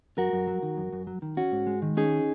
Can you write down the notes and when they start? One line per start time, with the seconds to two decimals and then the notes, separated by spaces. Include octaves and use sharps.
0.18 F#2 F#4 A#4
0.33 F#2
0.47 F#3
0.63 D#3
0.77 F#2
0.93 F#2
1.07 F#3
1.22 D#3
1.37 C#4 F#4
1.52 G#2
1.67 G#3
1.82 D#3
1.97 C#4 D#4 G#4